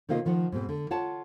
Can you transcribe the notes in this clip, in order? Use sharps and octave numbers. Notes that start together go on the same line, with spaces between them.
C3 D#3 A#3 F4 D#5
D#3 F3 D#4 F#5
G#2 B2 C4
D3
F4 C#5 F#5 A5